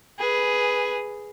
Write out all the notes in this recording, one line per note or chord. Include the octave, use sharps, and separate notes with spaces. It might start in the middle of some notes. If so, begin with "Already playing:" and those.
G#4 B4